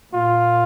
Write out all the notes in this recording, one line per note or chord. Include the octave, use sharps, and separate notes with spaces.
A#2 F4